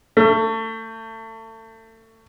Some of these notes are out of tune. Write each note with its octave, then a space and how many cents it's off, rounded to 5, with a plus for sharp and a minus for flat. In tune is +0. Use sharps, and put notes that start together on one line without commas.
A3 +30